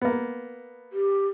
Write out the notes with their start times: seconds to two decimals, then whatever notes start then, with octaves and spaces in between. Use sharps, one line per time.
0.02 A#3 B3
0.93 G4